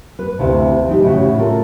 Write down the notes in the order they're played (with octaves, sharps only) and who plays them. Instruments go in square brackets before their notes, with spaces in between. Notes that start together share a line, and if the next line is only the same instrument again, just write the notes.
[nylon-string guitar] B4
D2 C3 E4 F5
E3 D#4 G4
A2 C#3 F#4
F4 A4 A#4